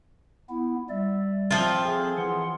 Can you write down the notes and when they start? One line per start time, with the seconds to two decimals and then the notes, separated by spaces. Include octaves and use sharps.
0.50 B3 E4
0.90 G3 D5 E5
1.51 F3 C4 F4 E5
1.83 G#4 A4
2.18 E3 F#5 C6